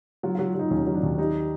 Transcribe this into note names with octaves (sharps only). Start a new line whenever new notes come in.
F#3 F4
F#3 F4
F#3 D#4
D#2 C#4
F#3
D4
D#2
G3 D#4